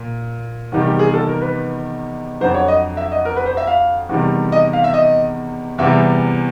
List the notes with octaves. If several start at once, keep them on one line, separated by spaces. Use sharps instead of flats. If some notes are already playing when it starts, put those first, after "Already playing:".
Already playing: A#2
E2 C3 D#3 G3
G4
G#4
A4
A#4
B4
F2 D3 F#3 C5
C#5
D#5
E5
D#5
A#4
B4
C5
E5
F5
E2 C3 D#3 G3
D#5
F5
E5
D#5
E2 C3 E3 G3 E5